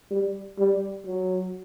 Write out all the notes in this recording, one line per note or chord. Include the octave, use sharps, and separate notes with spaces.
G3
G3
F#3